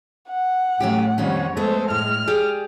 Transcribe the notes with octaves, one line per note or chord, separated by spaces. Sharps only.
F#5
A2 F#3 A3 C#4 G4
F2 A#2 D#3 G3 C#4 C#5
G#3 A3 B3 A4 C5
A2 F6
G4 G#4 D5